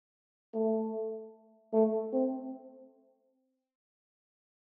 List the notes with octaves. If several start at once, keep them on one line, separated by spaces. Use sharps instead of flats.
A3
A3
C4